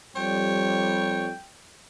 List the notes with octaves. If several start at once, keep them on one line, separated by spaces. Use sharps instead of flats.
F2 G3 C#5 G5